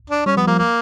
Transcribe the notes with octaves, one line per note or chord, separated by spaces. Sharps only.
D4
G3 C#4
F3 B3
F3 A#3
A#3